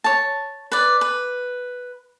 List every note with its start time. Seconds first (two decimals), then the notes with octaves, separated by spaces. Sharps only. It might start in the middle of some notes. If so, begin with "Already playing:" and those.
0.04 C#5 A5
0.72 B4 D5
1.01 B4